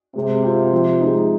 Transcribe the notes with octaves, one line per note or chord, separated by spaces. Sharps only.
C3 G#3
C4 F4
F3
G#3 D#4